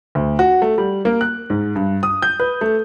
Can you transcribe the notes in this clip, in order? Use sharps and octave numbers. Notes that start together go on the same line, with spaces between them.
D2
F#4
A3
G3
A#3
F#6
G#2
G2
D#6
G6
B4
A3